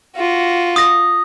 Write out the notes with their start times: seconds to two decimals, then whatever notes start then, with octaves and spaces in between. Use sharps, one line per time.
0.16 F4 F#4
0.76 D#6 A#6